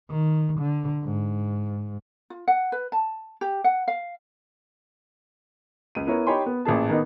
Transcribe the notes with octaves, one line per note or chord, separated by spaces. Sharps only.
D#3
D3
G#2
F4
F#5
B4
A5
G4
F#5
F5
C#2 D#7
B3 E4 A#4 C#5
D#4 G4 C#5 G5 B5 C6
B3
A1 A#2 G#4 A5
D#3 B3 D#4